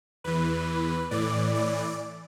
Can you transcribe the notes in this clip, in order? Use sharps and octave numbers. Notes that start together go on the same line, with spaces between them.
E2 E3 B4
A2 E3 D5
D5